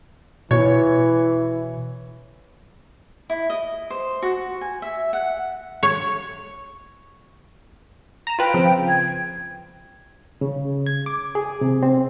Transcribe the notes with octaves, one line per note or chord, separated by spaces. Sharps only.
B2 E3 C#5
E4
D#5
C5
F#4
G#5
E5
F#5
C#5
A#5 E7
F4 B4 G5
C#3 F3 C4
G#6
C#3
G#6
D6
G#4
C3
C4